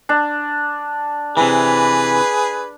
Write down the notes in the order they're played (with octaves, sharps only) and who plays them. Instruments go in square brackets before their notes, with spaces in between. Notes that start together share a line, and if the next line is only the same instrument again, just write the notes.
[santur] D4
[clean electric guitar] C3 E3 [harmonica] G#4 B4